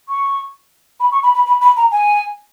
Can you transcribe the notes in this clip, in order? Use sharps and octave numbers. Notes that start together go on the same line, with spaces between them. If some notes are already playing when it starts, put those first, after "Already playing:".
C#6
B5
C#6
B5
B5
B5
B5
A#5
G#5